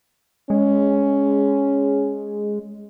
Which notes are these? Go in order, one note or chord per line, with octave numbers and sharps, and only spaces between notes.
G#3 C#4